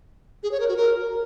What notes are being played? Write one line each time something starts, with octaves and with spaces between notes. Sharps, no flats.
G#4
C#5
A#4
F#4
A#4